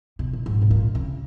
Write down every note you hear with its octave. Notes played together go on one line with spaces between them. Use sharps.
B2
A#2
G#2
B2
A#2
C#3